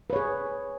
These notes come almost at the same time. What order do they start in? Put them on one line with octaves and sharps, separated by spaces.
B4 C#5 G#4